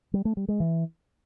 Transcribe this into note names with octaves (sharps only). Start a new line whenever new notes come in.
G3
A3
G3
G#3
E3